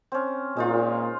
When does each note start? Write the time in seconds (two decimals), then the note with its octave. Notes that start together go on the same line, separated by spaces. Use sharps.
0.12 C4 C#4
0.57 A#2 G#3 D#4 F4